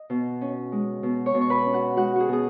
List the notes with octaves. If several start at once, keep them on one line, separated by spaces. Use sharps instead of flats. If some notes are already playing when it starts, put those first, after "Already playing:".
Already playing: D#5
B2
C#4
G#3
B2
C#5 C#6
B2
C#6
B4 B5
C#4
F#4 F#5
G#3 F#4 F#5
F#4 G#4
B2 G#4